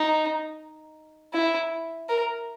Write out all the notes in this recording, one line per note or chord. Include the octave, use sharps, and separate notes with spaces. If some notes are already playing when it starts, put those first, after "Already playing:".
Already playing: D#4
E4
A#4